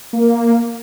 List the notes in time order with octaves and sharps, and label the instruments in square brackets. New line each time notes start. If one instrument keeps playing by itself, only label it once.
[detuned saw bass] A#3